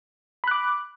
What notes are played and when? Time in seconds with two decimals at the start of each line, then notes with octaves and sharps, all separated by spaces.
0.44 B5
0.48 F#6
0.51 D6